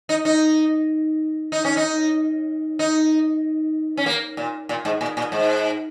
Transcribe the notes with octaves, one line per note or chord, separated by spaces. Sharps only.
D#4
D#4
D#4
C#4
D#4
D#4
C#4
A#3
A#2
A#2
G#2
A#2
A#2
G#2